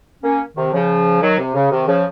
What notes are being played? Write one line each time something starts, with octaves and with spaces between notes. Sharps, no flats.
A#3 C#4
C3 D#3
C#3 F3
D#3 F#3
C3
C#3
C3 D#3
C#3 F3